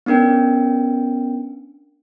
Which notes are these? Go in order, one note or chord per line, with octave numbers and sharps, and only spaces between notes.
B3 C#4 D4 A#4 G5